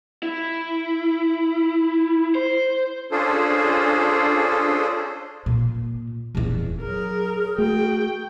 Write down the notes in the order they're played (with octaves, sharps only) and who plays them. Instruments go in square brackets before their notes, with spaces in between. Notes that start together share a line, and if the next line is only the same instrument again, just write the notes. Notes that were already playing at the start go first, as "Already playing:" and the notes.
[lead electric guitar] E4
C5
[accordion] C#4 D4 F4 G#4 A4 C5
[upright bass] A#2
D#1 E2
[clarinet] F#3 [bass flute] G#4 [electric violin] A#4
[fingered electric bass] A3 [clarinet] F#4 [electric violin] G5